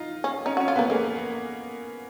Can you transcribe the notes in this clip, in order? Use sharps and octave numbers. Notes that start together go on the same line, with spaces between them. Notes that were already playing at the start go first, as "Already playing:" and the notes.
Already playing: D#4 F4
C#4
C#4 D#4
F#4
C#4
F4
B3
A#3
G#3 A#3